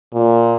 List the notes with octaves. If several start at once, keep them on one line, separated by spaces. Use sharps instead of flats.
A#2